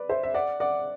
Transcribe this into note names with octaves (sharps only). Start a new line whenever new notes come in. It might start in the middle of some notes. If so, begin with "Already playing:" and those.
Already playing: B4 D5
C5 E5
E5
D5 F#5
D5 F#5